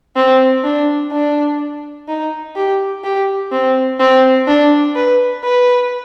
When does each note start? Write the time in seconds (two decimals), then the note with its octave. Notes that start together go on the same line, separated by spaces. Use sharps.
0.16 C4
0.64 D4
1.11 D4
2.08 D#4
2.56 G4
3.04 G4
3.52 C4
4.00 C4
4.47 D4
4.95 B4
5.44 B4